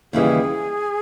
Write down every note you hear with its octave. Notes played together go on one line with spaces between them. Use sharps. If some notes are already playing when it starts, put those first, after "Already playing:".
D#2 C#3 E3 G3 G#4